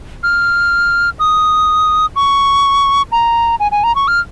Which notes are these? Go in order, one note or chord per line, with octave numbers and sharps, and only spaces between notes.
F6
D#6
C#6
A#5
G#5
G#5
A#5
C#6
F6